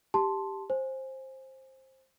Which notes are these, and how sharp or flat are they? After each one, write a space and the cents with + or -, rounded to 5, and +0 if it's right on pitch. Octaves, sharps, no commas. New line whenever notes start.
G4 +0 A5 +0 C6 +0
C5 +15 G#5 +0